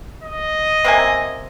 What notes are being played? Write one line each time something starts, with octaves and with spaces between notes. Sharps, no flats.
D#5
C3 A#3 G#5